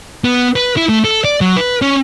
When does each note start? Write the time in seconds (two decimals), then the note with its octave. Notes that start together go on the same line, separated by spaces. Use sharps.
0.24 B3
0.56 B4
0.77 E4
0.89 A3
1.04 A4
1.25 D5
1.41 F#3
1.56 B4
1.82 C#4